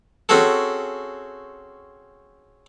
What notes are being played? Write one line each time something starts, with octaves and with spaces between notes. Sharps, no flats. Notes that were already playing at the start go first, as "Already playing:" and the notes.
C4 C#4 F#4 G#4 A4